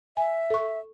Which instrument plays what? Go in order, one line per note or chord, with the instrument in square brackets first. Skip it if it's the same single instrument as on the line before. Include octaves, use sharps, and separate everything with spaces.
[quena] E5 [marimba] G#5
[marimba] A4 C#6